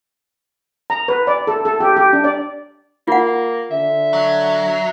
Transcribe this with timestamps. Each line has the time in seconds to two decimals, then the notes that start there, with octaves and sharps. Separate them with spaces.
0.90 A#5
1.08 B4
1.27 D5
1.47 A4
1.65 A4
1.80 G4
1.97 G4
2.13 D4
2.24 D5
3.08 A#3 F4 F#5
3.71 D3 E5
4.13 F#3